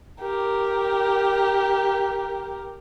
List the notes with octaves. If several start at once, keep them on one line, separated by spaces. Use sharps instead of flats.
G4 A#4